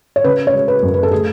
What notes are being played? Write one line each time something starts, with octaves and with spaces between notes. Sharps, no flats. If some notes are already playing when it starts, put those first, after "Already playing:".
C#5
C#3 B4
C#5
G#3
B4
F#2
B4
A4
A3 G#4